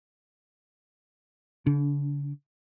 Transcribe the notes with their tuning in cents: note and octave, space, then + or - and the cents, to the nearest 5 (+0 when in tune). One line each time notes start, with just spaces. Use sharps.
D3 -45 D4 -20